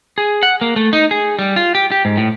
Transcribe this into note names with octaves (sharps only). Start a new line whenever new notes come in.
G#4
F#5
A#3
A3
D#4
G#4
G3
F4
G4
G4
G#2
A2